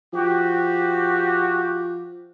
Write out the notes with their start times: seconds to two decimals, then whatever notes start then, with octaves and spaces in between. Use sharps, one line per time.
0.13 F3 F#4 G4